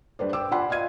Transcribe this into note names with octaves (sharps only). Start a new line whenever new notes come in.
G2 B4 C5 D5
G5 D6 E6
F4 D5 F#5 G#5 B5 C6
D5 D#5 F5 G#6 D#7